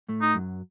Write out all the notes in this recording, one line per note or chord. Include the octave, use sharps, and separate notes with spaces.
A2 A3
D#4
F#2 F#3